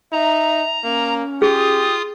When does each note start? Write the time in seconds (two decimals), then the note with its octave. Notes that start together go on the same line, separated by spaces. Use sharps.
0.12 D#4 E5 A#5
0.84 A#3 C#4
1.42 F4 G4 G#4 D#6